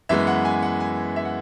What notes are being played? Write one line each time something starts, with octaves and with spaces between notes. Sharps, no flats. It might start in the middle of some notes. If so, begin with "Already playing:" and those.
F#2 E3 G#3 B3 E5
F#5
G#5
F#5
G#5
E5
F#5